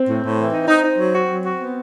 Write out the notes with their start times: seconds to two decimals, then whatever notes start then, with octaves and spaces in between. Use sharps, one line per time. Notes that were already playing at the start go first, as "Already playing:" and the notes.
Already playing: C4
0.08 A2
0.24 A2
0.39 E3
0.53 D#4
0.68 D#4
0.84 D#4
0.99 F#3
1.14 F#4
1.30 F#3
1.45 F#4
1.60 B3